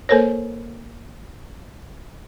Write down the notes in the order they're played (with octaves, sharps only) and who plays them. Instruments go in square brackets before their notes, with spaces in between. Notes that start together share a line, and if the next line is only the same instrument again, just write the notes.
[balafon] A#3 A4 A#4 C5 C#5